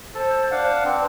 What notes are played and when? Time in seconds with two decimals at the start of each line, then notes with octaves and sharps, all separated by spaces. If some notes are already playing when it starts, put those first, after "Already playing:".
0.15 A4 C5
0.51 D4 F5 F#5
0.85 C4 D4 B4